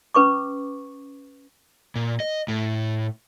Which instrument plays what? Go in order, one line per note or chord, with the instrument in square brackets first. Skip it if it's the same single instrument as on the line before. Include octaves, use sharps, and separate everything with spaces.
[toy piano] C#4 B4 C#6 D6
[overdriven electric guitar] A#2
D#5
A2